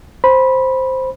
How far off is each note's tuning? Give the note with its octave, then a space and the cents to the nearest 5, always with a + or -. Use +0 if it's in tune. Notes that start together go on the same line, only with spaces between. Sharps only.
C5 +0 B5 -15